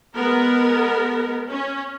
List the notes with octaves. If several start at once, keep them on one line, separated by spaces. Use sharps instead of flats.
G#3 B3 A#4
C#4